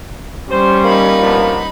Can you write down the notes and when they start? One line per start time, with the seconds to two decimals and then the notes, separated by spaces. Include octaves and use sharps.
0.51 G3 C#4 C5
0.84 A#3 D#4 B5
1.21 F3 B3 D4